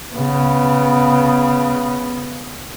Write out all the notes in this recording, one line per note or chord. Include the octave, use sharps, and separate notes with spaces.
C#3 B3